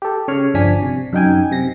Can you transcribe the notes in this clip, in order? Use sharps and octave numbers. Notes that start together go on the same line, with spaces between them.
G4 A4
C#3 C#5 F6
G1 F3 D4 G#5 B6
C3
F#2 D#4 G5 G#5
C3 A#6